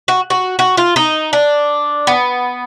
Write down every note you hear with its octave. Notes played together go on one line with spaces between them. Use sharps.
F#4
F#4
F#4
F4
D#4
D4
B3